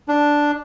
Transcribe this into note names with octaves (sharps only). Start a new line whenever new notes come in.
D4